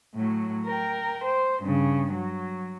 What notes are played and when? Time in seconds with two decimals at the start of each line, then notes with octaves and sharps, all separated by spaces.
0.15 A2 F#3
0.66 A#4 G5
1.25 C5
1.64 G2 C#3
2.13 F#3